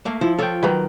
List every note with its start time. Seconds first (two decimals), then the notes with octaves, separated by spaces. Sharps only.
0.05 A3 A#3
0.21 F3 E4
0.39 F4 A4 C#5 G5
0.63 D#3 F#3 B4 A#5 B5